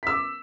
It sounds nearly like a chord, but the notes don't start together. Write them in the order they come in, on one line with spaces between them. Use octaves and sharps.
B6 E6 D6